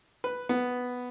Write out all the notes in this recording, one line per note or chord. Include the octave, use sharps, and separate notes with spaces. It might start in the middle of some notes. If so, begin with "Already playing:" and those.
B4
B3